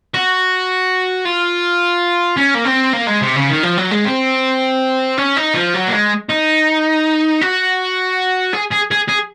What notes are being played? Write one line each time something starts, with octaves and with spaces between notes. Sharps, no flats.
F#4
F4
C#4
A#3
C4
A#3
G#3
C3
C#3
D#3
F3
F#3
G#3
C4
C#4
D#4
F3
F#3
A#3
G#3
D#4
F#4
G#4
G#4
G#4
G#4